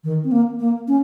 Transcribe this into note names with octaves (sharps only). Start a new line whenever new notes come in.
D#3
C4
A#3
A#3
C#4